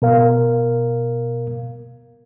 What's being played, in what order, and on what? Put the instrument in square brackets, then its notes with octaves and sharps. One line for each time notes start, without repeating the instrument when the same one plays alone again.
[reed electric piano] B2 A#4 F5